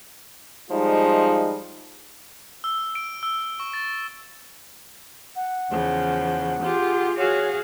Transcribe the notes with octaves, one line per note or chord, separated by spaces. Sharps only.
F3 G3 G#3 D#4 F4
E6
D7
E6
C#6
A6
F#5
E2 C#3 F3
F4 G4 G#4
F#4 G#4 C#5 F5